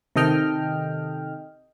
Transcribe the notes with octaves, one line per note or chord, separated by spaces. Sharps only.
C3 D#3 A4 D#5 G5 F6